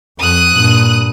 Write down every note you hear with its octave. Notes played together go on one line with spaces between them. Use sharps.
F2 D#6 F#6
G2 A#2